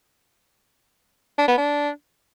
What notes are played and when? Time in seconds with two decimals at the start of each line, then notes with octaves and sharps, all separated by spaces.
1.38 D4
1.48 B3
1.58 D4